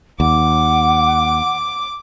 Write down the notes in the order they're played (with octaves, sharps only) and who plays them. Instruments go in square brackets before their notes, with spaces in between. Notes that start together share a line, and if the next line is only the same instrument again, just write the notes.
[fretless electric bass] D#2 [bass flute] F#5 [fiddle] D6